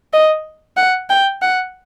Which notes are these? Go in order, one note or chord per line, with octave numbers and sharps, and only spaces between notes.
D#5
F#5
G5
F#5